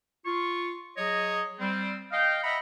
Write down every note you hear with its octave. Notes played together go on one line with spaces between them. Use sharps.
F4 C#6
F#3 G#4 C#5 D#5
G3 C4
D#5 F5 G5
D#5 E5 F#5 A#5 B5